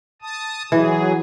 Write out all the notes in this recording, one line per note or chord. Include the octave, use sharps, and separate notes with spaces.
A5 D#6
E3 F#3 G#4